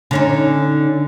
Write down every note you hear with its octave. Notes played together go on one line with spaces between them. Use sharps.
D3 C#4 D#4